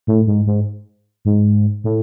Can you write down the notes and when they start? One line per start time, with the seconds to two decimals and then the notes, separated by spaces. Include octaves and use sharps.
0.07 A2
0.27 G#2
0.46 G#2
1.25 G#2
1.84 A2